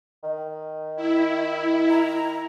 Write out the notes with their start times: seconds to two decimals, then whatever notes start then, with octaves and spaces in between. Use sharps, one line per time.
0.24 D#3
0.96 E4
1.90 A#5